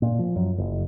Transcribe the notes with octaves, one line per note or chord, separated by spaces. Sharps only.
A#2
F3
F#2
F#1